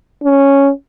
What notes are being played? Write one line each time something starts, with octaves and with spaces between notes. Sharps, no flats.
C#4